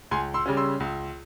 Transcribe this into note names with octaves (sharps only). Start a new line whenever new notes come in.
C#2 G#5 C6
C6 E6
C#3 G3 C#4
C6 E6
C#2